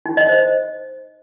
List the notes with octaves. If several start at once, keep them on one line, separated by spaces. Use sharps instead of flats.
D#4
D#5
C5